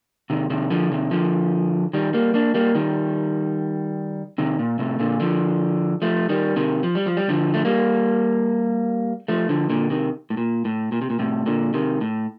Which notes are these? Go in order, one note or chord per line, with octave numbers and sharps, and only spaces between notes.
C3 D#3
C3 D#3
D3 F3
C3 D#3
D3 F3
D#3 G3
G3 A#3
A#3 D4
G3 A#3
D#3 G3
C3 D#3
A#2
A2 C3
A#2 D3
D3 F3
F3 A3
D#3 G3
C3 D#3
F3
G3
F3
G3
D3 F3
A3
G3 A#3
F3 A3
D3 F3
A#2 D3
C3 D#3
A2
A#2
A2
A#2
C3
A#2
A2 C3
A#2 D3
C3 D#3
A2